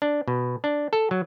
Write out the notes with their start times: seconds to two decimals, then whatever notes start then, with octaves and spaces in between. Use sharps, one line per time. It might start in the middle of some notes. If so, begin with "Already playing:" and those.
0.02 D4
0.28 B2
0.64 D4
0.93 A4
1.11 F#3